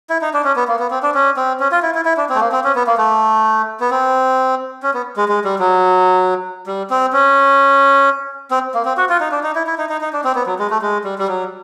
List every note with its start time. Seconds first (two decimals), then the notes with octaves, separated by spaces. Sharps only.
0.10 E4
0.22 D#4
0.34 D4
0.44 C#4
0.56 B3
0.68 A#3
0.79 B3
0.91 C4
1.03 D4
1.14 C#4
1.37 C4
1.60 C#4
1.71 F4
1.83 E4
1.95 E4
2.05 E4
2.17 D4
2.30 C4
2.35 A3
2.40 A#3
2.52 C4
2.64 C#4
2.75 B3
2.87 A#3
2.98 A3
3.80 B3
3.90 C4
4.83 C#4
4.94 B3
5.17 G#3
5.29 G#3
5.45 G3
5.59 F#3
6.67 G3
6.90 C4
7.13 C#4
8.51 C4
8.74 A#3
8.85 C4
8.97 F#4
9.09 F4
9.20 D#4
9.32 D4
9.43 D#4
9.55 E4
9.67 E4
9.78 D#4
9.89 D#4
10.01 D#4
10.13 D4
10.24 C4
10.35 B3
10.46 F#3
10.59 G#3
10.70 A3
10.82 G#3
11.04 G3
11.19 G3
11.28 F#3